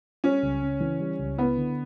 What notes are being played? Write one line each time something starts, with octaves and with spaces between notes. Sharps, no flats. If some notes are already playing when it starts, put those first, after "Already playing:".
G3 C#4
C#2
C#3
E3
G3
C#2
B3 E4
D3